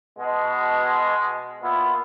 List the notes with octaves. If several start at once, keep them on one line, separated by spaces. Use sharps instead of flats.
B2 G#3
A#2 B3 E4 F4